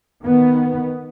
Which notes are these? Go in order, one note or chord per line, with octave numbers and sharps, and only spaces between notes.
D#3 B3